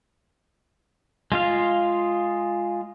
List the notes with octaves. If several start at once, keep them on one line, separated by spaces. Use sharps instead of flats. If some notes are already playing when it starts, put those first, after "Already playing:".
G#3 F4 F5